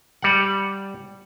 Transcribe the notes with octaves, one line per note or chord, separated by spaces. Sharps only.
G3 F#5